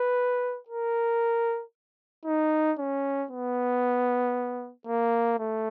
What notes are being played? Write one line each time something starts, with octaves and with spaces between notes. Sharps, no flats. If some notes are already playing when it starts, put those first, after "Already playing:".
Already playing: B4
A#4
D#4
C#4
B3
A#3
A3